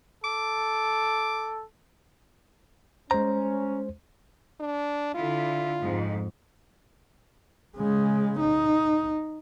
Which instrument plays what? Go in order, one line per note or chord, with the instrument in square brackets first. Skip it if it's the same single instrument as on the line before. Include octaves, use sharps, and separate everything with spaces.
[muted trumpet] A4 [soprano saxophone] D6
[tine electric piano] G#3 C5 [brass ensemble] C#4 [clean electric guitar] A#5
[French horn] D4
[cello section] D3 E4 [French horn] F4
[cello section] F2 G#2
[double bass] C#3 G#3
D#4